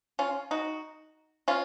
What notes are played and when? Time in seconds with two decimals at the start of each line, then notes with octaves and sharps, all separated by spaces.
0.19 C#4 F4
0.51 D#4 F#4
1.48 C#4 F4